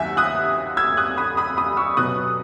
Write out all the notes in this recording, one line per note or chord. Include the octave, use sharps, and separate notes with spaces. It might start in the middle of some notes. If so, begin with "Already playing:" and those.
Already playing: D#2 D#3 F#3 E5 F#5 G#5
D#6 F#6
E6 G#6
D#6 F#6
B5 D#6
B5 D#6
B5 D#6
C#6 E6
B2 F#3 B3 D#6 F#6